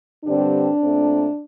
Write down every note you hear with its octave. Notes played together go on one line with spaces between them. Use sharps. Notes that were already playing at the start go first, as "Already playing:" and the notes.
G2 D3 G3 C4 D4
A#2 A3 C4